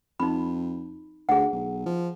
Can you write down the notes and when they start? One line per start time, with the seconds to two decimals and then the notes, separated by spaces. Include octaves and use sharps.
0.20 F2 D#4 B5
1.29 D2 G#4 F#5
1.53 B1
1.86 F3